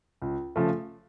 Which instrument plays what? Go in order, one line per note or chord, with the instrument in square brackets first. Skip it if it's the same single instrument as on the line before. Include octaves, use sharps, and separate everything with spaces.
[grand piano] C#2
C#3 F3 A3